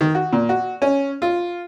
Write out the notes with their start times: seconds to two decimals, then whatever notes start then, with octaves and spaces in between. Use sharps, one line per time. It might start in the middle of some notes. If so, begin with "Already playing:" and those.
0.01 D#3
0.15 F#4
0.33 A#2
0.49 F#4
0.82 C#4
1.22 F4